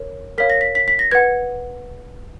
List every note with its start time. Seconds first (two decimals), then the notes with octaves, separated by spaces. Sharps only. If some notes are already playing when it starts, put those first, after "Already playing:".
Already playing: A#4 C#5
0.38 A#4 C#5 F5 B6
0.50 A#6
0.61 B6
0.75 B6
0.88 B6
0.99 A#6
1.11 B4 F#5 G#6